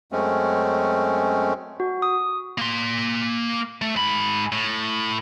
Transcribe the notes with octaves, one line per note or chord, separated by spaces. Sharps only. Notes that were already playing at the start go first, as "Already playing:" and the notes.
F#2 G#3 A3 C4 C#4
F#4
D#6
A#3 C6
A3
G#2 B5
A2